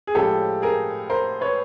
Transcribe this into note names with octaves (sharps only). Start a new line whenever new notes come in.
G#4
A2 F3 G#3 C#4 G4 A4
G#4 A#4
A#4 C5
B4 C#5